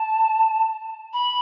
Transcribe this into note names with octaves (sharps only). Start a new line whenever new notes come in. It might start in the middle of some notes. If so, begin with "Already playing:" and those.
Already playing: A5
B5